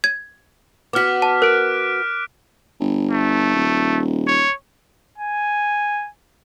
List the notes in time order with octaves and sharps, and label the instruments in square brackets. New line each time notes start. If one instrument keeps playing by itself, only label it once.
[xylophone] G#6
[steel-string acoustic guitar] B3 F#4 [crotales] D6 F6 B6
[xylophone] A5
[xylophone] A#4 [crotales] F#6 D7
[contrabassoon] G1
[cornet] A3
[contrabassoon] D#1
[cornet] C#5
[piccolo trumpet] G#5